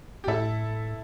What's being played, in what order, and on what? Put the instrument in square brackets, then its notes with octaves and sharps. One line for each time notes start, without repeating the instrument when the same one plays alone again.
[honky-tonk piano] G4
[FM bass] A2 [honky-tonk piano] E4 A4